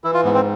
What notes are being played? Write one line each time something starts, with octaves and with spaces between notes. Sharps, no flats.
E3 E4
F4
G#2 B3
C4